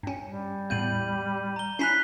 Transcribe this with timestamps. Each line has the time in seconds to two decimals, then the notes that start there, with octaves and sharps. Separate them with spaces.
0.03 G2 C#4
0.25 G3
0.70 E2 A2 G6 D#7 F#7
1.56 A#5 G7
1.79 C#4 E4 A#5 F#6 B6 C7